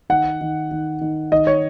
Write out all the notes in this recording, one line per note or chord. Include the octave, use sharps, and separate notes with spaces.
D#3 F#5
D#3
D#3
D#3
D#3 D#5
C#5